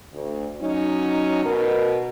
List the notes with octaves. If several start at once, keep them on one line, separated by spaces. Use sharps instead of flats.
D2
F#3 C#4 D#4
B2 A#4